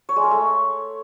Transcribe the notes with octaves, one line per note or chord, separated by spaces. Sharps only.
C#5
G#3
A#4
A3